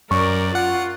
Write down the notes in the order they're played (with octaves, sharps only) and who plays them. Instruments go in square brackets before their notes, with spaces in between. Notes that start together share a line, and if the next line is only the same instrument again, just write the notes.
[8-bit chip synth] F#2 [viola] A#4 D5 [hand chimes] C#6
[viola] F4 [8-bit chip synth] F#5